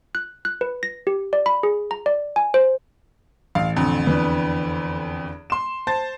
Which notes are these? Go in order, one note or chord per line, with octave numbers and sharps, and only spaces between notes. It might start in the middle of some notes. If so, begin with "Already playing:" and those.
F#6
F#6
B4
A#6
G4
D5
B5
G#4
A#5
D5
G#5
C5
A1 F5
F2 D3
E2 D4 B4
C6 E7
C5 A5 A6